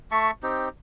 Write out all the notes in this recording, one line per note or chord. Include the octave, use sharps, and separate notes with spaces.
A3 E5 A5 C#6
C4 D#4 G4